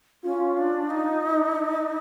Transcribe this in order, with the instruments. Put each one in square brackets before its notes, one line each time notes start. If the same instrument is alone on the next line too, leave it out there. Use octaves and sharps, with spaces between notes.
[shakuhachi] C#4 [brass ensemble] F4
[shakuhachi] D4
D#4